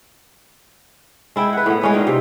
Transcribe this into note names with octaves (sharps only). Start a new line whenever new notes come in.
G#3 E4 G5
B4 F#5
A2 B3
G#3 C#4 B4
A#2 D#4 G5
C3